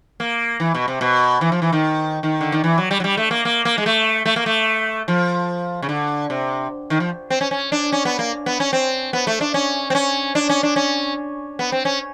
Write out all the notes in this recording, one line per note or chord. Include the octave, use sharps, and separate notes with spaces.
A#3
E3
B2
C3
B2
E3
F3
E3
D#3
D#3
D3
D#3
E3
F#3
G3
F#3
G3
A3
A#3
A#3
A#3
G#3
A3
A3
A#3
A3
F3
C#3
D3
C3
D#3
F3
C4
C#4
C#4
D4
C#4
B3
A#3
B3
C#4
C4
B3
A3
D4
C#4
C4
C#4
D4
C#4
D4
C#4
B3
C4
C#4